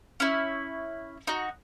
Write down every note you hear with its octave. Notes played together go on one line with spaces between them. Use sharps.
C#4 E4
D#4 F#4